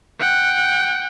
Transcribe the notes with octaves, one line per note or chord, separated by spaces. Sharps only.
F#5 G5